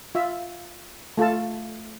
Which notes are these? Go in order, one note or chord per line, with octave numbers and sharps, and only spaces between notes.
F4 E5
A3 F4 A4 A5